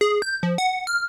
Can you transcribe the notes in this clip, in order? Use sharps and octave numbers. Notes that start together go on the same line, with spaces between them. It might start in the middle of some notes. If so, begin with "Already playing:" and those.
G#4
G6
F3
F#5
F6